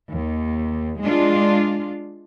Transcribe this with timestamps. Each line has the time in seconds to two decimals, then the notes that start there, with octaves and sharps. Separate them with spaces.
0.11 D#2
1.01 G#3 D4 F4